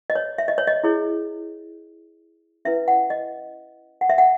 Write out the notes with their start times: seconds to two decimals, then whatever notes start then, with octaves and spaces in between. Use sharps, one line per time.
0.10 D#5
0.16 C#5
0.38 E5
0.48 D#5
0.58 C#5
0.67 D#5
0.84 E4 G#4 C#5
2.65 C#4 E4 B4 E5
2.88 F#5
3.10 D#5
4.01 F#5
4.10 E5
4.18 F#5